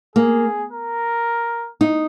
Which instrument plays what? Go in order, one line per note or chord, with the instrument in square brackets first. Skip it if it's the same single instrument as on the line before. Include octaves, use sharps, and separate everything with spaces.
[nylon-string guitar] A#3 [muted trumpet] G#4
[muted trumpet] A#4
[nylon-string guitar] D#4